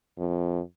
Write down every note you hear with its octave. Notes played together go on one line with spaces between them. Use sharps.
F2